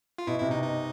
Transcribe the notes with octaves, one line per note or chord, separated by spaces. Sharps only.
F4
B2 E4
C3 E4
B2 D#4
D#4